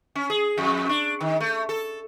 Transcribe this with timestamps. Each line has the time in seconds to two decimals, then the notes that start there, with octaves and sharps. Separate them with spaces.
0.15 C#4
0.30 G#4
0.58 F2
0.89 D4
1.20 D#3
1.40 A3
1.69 A4